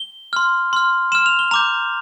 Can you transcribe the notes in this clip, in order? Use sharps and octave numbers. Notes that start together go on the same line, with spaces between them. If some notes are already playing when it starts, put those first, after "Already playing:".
Already playing: G7
C6 F6
C6 F6
C6 F6 E7
F7
G7
A#5 D6 G6 F7